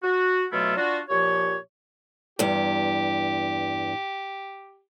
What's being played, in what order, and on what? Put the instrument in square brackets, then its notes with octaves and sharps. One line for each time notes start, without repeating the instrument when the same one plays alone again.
[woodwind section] F#4
B2 F#3 A3 E4 F4 A4
D4 F4 F#4
A#2 F3 G4 C#5
[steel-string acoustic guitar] E2 G2 [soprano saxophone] G4